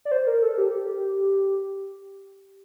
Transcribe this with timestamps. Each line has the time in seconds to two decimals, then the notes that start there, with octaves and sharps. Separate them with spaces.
0.05 D5
0.12 C5
0.27 A#4
0.42 A4
0.58 G4